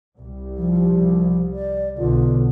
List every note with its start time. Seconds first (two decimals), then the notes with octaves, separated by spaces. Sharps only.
0.20 C2 G3
0.57 F3
1.53 D5
1.98 B1 B2 D3 F4